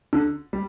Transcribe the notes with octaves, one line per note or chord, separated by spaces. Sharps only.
D3
G3